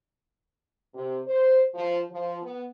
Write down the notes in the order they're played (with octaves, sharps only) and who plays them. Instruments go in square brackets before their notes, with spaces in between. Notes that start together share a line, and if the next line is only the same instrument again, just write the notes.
[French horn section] C3
C5
F3
F3
B3